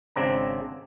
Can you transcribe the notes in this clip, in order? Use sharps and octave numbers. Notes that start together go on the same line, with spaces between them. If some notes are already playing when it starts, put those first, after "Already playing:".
G#1 C#3 C4 D4 A#5